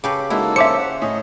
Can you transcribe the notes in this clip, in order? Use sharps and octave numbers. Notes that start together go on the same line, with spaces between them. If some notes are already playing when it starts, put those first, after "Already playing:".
C#3 G4 A4 B4 D6
G#3 A#3 D#4 E4 F#4 A4 E6
C#4 C5 E5 D6 C#7
F#5
A2 C#4 D#5